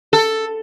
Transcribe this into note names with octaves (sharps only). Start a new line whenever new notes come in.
A4